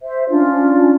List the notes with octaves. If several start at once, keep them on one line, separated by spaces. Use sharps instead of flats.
C5 E5
C#4 D4 F4